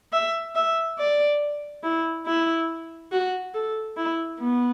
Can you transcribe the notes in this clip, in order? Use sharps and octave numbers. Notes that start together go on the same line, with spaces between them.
E5
E5
D5
E4
E4
F#4
A4
E4
B3